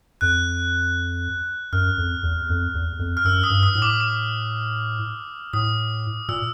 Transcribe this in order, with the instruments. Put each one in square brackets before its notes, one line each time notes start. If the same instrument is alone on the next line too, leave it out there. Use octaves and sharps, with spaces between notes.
[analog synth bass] F2 [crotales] F#6
[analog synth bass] F#2 [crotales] F6
[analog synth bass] F2
E2
F2
E2
F2
[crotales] F6
[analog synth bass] F#2 [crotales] E6
[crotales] D#6
[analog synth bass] G2
[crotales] D#6
[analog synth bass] A2
[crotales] D6
D6
[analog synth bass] A2 [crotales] D#6
[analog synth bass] A#2 [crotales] E6